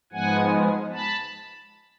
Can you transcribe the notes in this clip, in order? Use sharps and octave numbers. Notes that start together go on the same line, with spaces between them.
G#2 F3 G#3 B3 F#5 G#5
A5 B5